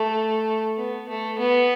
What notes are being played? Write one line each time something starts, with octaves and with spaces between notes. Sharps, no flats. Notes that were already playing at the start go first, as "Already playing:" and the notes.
Already playing: A3
B3
A3
B3